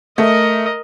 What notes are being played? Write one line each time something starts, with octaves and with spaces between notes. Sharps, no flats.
A3 A#4 D#5